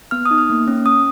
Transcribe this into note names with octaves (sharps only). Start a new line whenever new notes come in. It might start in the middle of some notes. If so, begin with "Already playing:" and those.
B3 F6
D#6
D#4
F6
A#3
C#4
C#4 D#6